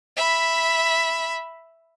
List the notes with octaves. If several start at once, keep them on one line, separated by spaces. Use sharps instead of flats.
E5 B5